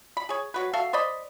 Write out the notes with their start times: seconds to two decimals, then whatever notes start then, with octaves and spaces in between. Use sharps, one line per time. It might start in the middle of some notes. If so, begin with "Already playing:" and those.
0.17 B5
0.29 G#4 C#5
0.54 F#3 F#4 B4
0.73 F#4 A4 E5 F5
0.93 C5 D5 D#5 B5